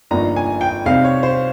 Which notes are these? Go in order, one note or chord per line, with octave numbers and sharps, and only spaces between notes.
G1 G2 F3 A#3 D#4 A#5
G#5
G5
C2 C3 G3 C4 D#4 F5
C#5
C5